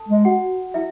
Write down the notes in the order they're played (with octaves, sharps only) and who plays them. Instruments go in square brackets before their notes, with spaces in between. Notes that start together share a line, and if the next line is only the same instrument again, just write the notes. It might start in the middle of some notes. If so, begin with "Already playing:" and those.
Already playing: [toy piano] A4 A5
[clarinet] G#3
[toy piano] F#4 F#5
E4 E5